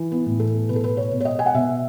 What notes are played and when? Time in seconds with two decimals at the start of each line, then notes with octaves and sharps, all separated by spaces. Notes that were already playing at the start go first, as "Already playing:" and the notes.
Already playing: E3
0.12 B3
0.26 A2
0.40 A4
0.69 B2 B4
0.76 A4
0.84 B4
0.97 C#5
1.11 B2
1.20 C#5
1.25 D#5
1.39 G#5
1.46 F#5
1.54 B2 E5